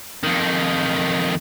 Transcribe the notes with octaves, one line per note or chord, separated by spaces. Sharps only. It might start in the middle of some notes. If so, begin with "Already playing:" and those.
F2 D#3